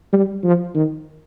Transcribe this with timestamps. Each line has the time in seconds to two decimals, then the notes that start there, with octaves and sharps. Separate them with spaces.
0.13 G3
0.44 F3
0.75 D#3